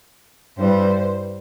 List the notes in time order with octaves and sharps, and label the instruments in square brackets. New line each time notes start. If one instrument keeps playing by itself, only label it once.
[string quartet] G2 E3 G3 C5